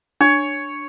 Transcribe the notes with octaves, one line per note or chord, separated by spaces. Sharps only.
D4 C#5